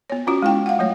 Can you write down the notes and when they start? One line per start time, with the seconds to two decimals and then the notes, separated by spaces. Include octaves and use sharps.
0.10 B3 C#5
0.27 C#4 F4 F#4
0.42 G#3 E4 G5
0.66 F5 F#5
0.79 F#3 A3 C#5